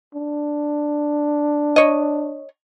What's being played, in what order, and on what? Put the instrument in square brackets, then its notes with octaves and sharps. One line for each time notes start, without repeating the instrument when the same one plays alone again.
[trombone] D4
[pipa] C#5 D#5